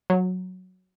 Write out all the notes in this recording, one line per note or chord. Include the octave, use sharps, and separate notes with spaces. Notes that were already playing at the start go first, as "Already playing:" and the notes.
F#3